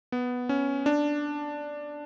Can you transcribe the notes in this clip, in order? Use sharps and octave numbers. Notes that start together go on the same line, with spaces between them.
B3
C#4
D4